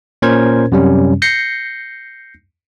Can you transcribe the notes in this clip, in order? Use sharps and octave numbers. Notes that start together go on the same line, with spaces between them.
A#2 C#4 A#4 C5 G#6
F#2 C3 G3 C#4
G6 A#6 C7 C#7